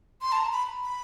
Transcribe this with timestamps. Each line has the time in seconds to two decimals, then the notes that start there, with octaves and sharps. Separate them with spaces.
0.21 C6
0.32 A5
0.36 A#5
0.52 B5
0.83 B5